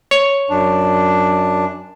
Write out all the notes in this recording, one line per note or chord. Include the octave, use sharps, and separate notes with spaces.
C#5
F#2 D4